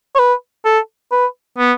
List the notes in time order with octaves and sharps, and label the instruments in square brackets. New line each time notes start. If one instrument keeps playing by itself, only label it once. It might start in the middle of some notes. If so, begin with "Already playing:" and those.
[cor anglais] C#5
B4
A4
B4
B3